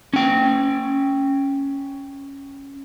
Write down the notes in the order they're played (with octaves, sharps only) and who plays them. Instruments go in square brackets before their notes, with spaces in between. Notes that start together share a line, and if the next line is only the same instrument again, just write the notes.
[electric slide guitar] C#4 G5